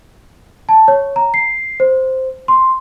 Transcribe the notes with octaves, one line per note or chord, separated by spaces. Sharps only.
A5
C#5
A#5
C7
C5
C6